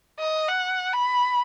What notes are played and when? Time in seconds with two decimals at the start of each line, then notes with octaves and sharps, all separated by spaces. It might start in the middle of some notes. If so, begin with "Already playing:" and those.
0.19 D#5
0.48 F#5
0.93 B5